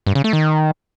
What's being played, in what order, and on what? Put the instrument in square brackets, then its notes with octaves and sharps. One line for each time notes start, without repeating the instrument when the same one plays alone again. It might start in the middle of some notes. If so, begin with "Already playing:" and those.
[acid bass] G2
C#3
A3
D#3